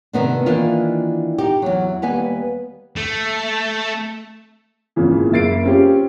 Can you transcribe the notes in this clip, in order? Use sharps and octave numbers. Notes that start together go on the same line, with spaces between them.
C3 D#3 B3 D4
D#3 E3 A#3 D4 F4
D#4 G4
E2 F#3
D#2 G3 B3 B4 G#5
A3
G#1 A#2 C#3 E3
F#1 A#3 E5 A6 C7 D7
C4 C#4 F4 G4